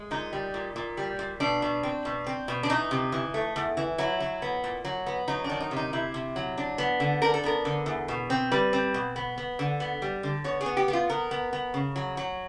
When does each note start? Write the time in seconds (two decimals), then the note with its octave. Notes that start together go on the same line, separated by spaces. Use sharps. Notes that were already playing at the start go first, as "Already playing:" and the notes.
Already playing: G#3
0.11 A#2 D#4
0.33 G3
0.54 A#2
0.76 A#2
0.97 G3
1.19 A#2
1.40 B2 D4
1.62 B2
1.83 C4
2.05 B2
2.27 C4
2.48 B2
2.63 D4
2.70 E3 D#4
2.91 C3
3.12 E3
3.34 A3
3.56 E2
3.77 E3
3.98 F#3 E4
4.20 F#3
4.42 B3
4.64 A#2
4.85 F#3
5.07 B3
5.28 F#3 D#4
5.44 D4
5.50 D#3
5.60 D#4
5.71 C3
5.76 D#4
5.93 C3 E4
6.14 C3
6.36 F#3
6.58 D4
6.78 B3
7.00 D3
7.22 D4 A#4
7.34 A4
7.44 B3 A#4
7.65 D3
7.86 E2
8.08 B2
8.30 C4
8.52 G3 B4
8.73 C4
8.94 B2
9.16 B3
9.38 B3
9.59 D3
9.80 B3
10.02 G3
10.23 D3
10.44 B3 C#5
10.61 G#4
10.66 B3
10.77 G4
10.88 B3
10.93 F4
11.09 B3 A#4
11.31 B3
11.53 B3
11.74 C#3
11.96 F#3
12.17 F#3